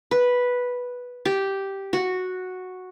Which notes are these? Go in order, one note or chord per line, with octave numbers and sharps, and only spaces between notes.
B4
G4
F#4